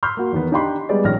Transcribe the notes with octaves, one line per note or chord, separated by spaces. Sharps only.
B5 C6 E6 F6 G6
A#3 F#4
E2 D#3 B3
D4 D#4 G4 G5 B5 C6
G3 G#3 B3 G#4 D5 D#5
A#1 D#3 C#4 F6 A#6